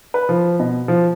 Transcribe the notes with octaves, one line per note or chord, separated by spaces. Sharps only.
B4
F3
B2
F3